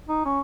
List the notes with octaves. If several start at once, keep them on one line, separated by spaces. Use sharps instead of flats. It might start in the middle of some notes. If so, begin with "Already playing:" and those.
D#4
C#4